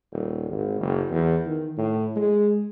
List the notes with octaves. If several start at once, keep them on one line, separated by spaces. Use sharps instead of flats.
D#1
G#1
F#1
E2
D#3
A2
G#3